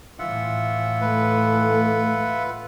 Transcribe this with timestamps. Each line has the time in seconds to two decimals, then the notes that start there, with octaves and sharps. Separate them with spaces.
0.19 A2 E3 F4 E5 F#5
1.01 A3 B4